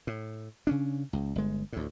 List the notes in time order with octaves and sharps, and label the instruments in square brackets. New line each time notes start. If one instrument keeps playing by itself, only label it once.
[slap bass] A2
C#3 C#4 D4
C#2
G1 G#3
D2 A2